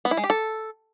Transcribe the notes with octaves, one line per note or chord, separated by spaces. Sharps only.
B3
E4
G#3
G4
A4